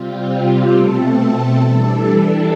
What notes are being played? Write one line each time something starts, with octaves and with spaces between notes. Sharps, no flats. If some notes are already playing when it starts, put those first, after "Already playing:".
Already playing: C3 G3 C4 F4
G4
B2 A3 C4 A4
E3 G3 D4